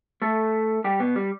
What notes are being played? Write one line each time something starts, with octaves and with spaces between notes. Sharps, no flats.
A3 A4
G3 G4
B2 B3
G3